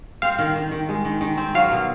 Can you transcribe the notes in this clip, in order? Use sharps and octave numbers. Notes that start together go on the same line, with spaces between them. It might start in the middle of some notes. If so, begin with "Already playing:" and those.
C4 F5
D#3
D#3
D#3
G#3
D#3
D#3
C4
F#3 F5
B2